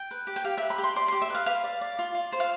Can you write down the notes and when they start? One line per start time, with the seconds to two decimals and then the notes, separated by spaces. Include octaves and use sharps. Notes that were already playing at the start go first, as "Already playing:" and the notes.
Already playing: G5
0.11 B4
0.27 G4
0.36 G5
0.44 G4 F5
0.58 E5
0.62 B4
0.70 B5
0.78 G4
0.83 C6
0.96 D5 C6
1.08 C6
1.13 G4
1.22 E5
1.30 B4 F5
1.46 B4 F5
1.64 D5
1.81 D5
1.99 F4
2.15 F4
2.32 C5
2.40 F5